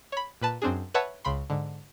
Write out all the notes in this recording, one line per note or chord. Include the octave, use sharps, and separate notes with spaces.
C#5 B5
A#2 B4 A5
F#2 C4 D4 G#4
B4 C#5 E5 F#5 A5 B5
C#2 C#3 B5 C6
G#2 D3